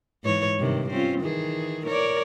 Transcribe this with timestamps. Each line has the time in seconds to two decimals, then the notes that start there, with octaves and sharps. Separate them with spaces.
0.24 G#2 E3 C#5
0.59 G2 C3 D#3
0.90 C4 C#4 F4
1.21 D#3 E3 G#4
1.86 A#4 C#5 D5